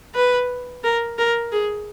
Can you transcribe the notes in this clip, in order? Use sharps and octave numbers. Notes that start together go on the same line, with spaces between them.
B4
A#4
A#4
G#4